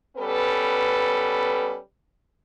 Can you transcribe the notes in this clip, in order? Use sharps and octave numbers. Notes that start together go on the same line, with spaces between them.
G3 B3 C#4 A4 B4